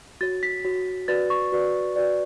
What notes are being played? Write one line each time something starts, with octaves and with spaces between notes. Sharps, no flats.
F#4 C#5 A6
B6
F#4 C#5
F#4 B4 D5 A6
C#6
F#4 B4 D5
F#4 B4 D5